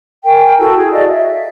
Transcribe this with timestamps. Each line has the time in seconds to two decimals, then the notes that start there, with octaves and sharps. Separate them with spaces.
0.25 A#4 G5 G#5
0.59 E4 F#4 A4 A5
0.77 G#4
0.91 F#4 D5 D#5 F5
1.09 E5